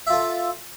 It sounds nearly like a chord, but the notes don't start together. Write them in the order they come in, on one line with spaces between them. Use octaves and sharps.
E5 F4 A4